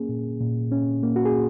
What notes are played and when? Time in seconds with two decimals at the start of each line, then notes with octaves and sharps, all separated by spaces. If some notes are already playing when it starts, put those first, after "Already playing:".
Already playing: A#3 C#4 G#4
0.09 A#2
0.41 A#2
0.72 C#4
1.03 A#3
1.16 F#4
1.25 G#4